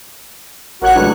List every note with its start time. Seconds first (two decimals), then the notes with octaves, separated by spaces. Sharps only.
0.82 A1 F#4 A#4 C#5 F#5 F#6
0.95 C#2 A2 F#3 D4 B4